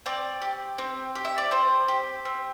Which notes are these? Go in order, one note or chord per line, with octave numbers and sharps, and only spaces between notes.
C4 D5
G4
C4
G4
E5
D5
C4 C5
G4
C4